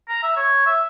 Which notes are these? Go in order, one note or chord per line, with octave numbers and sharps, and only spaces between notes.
A#5
E5
C#5
E5